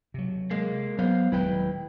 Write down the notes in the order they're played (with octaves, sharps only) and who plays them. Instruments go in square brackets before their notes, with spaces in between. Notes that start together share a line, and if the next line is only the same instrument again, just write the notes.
[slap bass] C3 F#3
[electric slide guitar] G#3 A#3
[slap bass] F#3 [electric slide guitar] B3 C5 F5
[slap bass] D#1 F#3 G#3 [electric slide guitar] E4 B4 G5